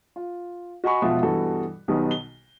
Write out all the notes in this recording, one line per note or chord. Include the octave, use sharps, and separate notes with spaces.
F4
F#4 D#5 G#5 B5 C#6
E1 B2 F3 F4 E5 F#5
G2 B2 E3 F#4 A4
B1 B2 D#3 G3 B3
G7